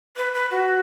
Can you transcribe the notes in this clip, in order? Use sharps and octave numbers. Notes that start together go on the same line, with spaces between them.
B4
B4
F#4